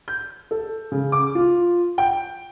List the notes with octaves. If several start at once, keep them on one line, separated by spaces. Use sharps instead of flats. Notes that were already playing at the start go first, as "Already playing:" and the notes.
G6
A4
C#3
D6
F4
G5